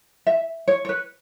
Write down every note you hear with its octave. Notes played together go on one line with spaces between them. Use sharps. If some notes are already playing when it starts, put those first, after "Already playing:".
E5
C#5
C#5
B4